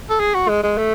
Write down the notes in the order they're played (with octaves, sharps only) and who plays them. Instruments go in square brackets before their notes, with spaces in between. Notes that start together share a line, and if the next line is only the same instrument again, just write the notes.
[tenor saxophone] A4
G#4
F#4
G#3
G#3
A3